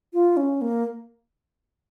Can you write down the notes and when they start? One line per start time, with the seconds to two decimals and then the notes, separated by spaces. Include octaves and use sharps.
0.13 F4
0.37 C#4
0.62 A#3